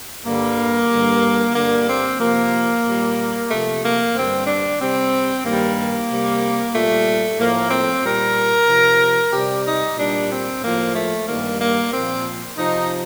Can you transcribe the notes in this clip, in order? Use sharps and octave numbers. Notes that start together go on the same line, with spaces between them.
G2 D3 G3 A#3
G2 D3 G3
G2 D3 G3 A#3
C4
C3 F3 A#3
A#2 G3
C3 F3 A3
A#3
G2 D3 G3 C4
D4
C3 G3 C4
G2 D#3 G3 A#3
C3 G3
A#2 G3 A3
A2 F3 A#3
C4
A#2 G3 A#4
C3 F3
C3 G3 G4
D#4
A#2 G3 D4
C4
A2 F3 A#3
A3
G2 D#3 G3 A#3
A#3
A#2 F3 C4
C3 F3 D#4